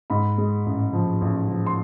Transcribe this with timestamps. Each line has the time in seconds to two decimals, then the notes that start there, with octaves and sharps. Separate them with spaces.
0.10 G#2 B5
0.38 G#3
0.66 A1
0.93 F3
1.21 A1
1.49 F3
1.66 C6